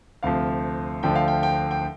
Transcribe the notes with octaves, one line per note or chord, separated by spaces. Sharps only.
D2 C3 F3 F5
D2 D3 F3 G5
F5
G5
G5
G5